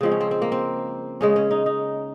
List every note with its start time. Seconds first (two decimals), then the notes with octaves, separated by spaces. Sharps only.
0.01 C#3 F3 G#3 C4
0.12 C#4
0.21 C4
0.31 C4
0.42 A#3
0.52 C4
1.21 C#3 G#3 C#4
1.36 C#4
1.51 D#4
1.66 D#4